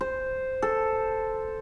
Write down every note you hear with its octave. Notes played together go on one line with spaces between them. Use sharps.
C5
A4